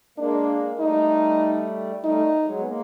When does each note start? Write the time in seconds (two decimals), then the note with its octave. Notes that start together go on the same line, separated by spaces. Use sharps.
0.18 G#3 A#3 D4
0.76 G#3
0.80 G3 A3 D#4
2.03 G3 A3 D#4
2.45 F#3 G#3
2.58 B3
2.65 G#3 A#3